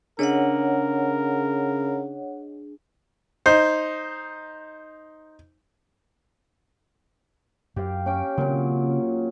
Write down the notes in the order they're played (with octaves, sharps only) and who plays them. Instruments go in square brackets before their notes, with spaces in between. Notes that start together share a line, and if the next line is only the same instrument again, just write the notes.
[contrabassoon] C#3 [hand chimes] D4 G#4 [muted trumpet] A#4 [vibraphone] C#5 D#5 F#5
[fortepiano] D#4 C5
[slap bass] F#2 [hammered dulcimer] G4 F5
[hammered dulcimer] C#4 G5 D6
[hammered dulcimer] A#2 F#3 [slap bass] C#3 C4